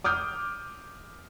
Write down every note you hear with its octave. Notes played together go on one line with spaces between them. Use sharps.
D6 D#6 F6 G6